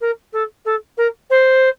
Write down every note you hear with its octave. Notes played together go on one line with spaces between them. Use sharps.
A#4
A4
A4
A#4
C5